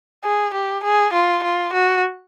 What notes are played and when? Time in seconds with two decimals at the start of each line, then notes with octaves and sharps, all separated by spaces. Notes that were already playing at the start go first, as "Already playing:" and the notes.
0.24 G#4
0.54 G4
0.84 G#4
1.13 F4
1.44 F4
1.73 F#4